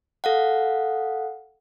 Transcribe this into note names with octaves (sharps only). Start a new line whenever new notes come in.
A4 F5 F#5